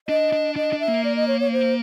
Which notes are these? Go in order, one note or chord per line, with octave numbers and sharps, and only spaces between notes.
D4 D#5
D4
D4 D#5
D4
E5
A#3
D5
D#5
C#5
C#5
C5